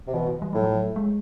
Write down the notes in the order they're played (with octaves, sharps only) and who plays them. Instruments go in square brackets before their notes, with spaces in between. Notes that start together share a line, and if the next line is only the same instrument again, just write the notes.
[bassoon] C3
[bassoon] B2 [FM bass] E3
[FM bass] E3
G3
[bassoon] A2 [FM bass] F#3
[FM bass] F3
F#3
G#3